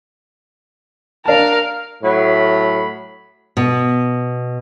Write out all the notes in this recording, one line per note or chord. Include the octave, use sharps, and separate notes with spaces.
D4 A#4 F5 A5
A2 F#3 B5
B2